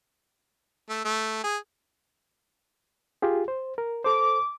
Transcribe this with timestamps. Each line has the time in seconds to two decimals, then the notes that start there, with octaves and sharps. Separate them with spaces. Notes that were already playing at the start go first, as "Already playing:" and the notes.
0.90 A3 E6
1.05 A3
1.44 G#4
3.22 F4 G4 G#4
3.48 C5
3.78 A#4
4.04 A4 C5 D6